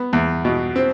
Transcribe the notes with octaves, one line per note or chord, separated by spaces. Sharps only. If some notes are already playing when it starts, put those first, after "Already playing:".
Already playing: B3
E2
B2
C4